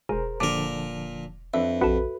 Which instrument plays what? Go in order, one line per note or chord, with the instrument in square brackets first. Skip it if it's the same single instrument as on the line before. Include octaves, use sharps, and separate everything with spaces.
[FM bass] E1 [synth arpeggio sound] G#4 [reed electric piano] A#4 C5
[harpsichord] A#2 A#4 [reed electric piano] D3 F3 A5 [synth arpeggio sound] D6
[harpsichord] F2 [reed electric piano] D4 B4 [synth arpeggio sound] E5
[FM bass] A#1 [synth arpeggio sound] F#4 A4 [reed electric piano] B4